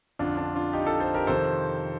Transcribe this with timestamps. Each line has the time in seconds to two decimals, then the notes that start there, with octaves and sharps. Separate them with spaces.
0.19 F2 D3 D4 F4
0.37 D4
0.55 D4 F4
0.73 D#4 G4
0.86 F4 A4
1.00 A4 C5
1.14 G4 A#4
1.27 F2 C3 D#3 A4 C5